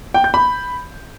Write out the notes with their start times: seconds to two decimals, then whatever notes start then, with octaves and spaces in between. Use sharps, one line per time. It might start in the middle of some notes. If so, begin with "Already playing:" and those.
0.14 G5
0.24 G6
0.34 B5